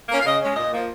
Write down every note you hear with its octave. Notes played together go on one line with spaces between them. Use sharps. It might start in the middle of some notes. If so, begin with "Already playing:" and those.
A#3 C#4
F5
C#3 D#5
G#3 C#4
A#2 D#5
F3 A#3